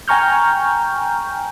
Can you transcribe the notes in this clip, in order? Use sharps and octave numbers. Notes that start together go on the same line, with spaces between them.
G5 G#5 A#5 C#6 F6 G6